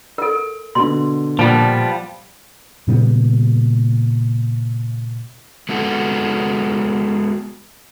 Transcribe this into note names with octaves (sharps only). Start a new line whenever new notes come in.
A4 A#4
B2 D3 C6
A#2 F3 G3 B3 A5
A#2 C#3 G3 B3
G#3 B3 F#4 A4